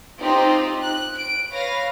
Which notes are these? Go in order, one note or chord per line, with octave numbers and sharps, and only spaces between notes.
C4 D#4 F4 G4
F#6
D7
B4 C#5 F5 A#6